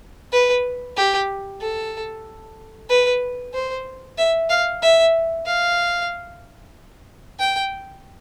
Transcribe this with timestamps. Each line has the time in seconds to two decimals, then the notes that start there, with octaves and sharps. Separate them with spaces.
0.32 B4
0.97 G4
1.61 A4
2.89 B4
3.53 C5
4.18 E5
4.50 F5
4.82 E5
5.46 F5
7.39 G5